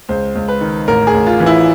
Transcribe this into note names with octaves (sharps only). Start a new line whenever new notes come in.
C#2 C5
C#2
B4
D#3
A1 A#4
G#4
A1
F4
E3
E4